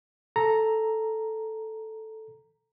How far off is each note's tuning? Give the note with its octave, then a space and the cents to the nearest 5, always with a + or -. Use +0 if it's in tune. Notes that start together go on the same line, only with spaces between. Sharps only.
A4 +0 A#5 +0